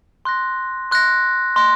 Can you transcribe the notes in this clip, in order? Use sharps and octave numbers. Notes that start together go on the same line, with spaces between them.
C6 F#6 A#6
C6 F#6 A#6
C6 F#6 A#6